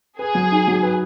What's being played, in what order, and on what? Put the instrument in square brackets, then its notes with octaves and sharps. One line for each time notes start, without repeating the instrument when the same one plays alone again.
[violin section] G#4 [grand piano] B4
[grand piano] F#3
D#4
F#3
B4